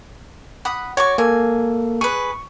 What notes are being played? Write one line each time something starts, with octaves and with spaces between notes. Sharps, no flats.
F#5 B5 D#6
F#4 C#5 D5 C#6
A#3 A4 G#5
G#4 B4 C#6